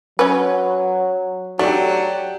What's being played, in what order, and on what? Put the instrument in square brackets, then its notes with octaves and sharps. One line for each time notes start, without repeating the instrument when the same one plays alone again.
[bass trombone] F#3 [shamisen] C#4 B4
[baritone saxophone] F#3 [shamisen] A3 [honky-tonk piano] D4 G4